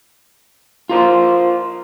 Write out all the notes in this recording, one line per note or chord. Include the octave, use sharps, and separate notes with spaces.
F4 A#4 C5